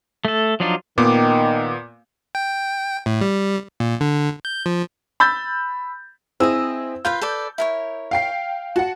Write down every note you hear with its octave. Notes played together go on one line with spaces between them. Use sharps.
A3 A4
F3 F#3 D4 D#4 F4
A#2 D#3 B3 D6
G5
A2
G3
A#2
D3
G6
F3
B5 E6 G6 A6
C4 E4 G#4 D#5 E6
F4 B4 F5 G6
A4 B4 D5
E4 A#4 C#5
F5 G5 C7
F#4 F#5 A5